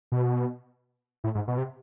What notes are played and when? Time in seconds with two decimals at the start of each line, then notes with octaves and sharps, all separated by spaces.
0.12 B2
1.24 A2
1.35 G#2
1.48 B2
1.58 C3